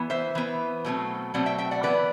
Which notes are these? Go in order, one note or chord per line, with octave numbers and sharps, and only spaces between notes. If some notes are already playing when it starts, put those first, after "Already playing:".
Already playing: E3 B3
C5 E5
E3 B3
B2 F#3 A3 C4
B2 F#3 A3 C4 D5 F#5
E5 G5
E5 G5
D5 F#5
E3 B3 B4 D5